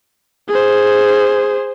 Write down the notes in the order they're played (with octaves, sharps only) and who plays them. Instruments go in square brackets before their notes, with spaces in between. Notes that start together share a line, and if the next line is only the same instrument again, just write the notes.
[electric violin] G#4 C5